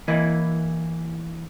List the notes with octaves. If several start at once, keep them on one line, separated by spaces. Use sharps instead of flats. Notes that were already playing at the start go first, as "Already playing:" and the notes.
E3 A#3 E4 D#5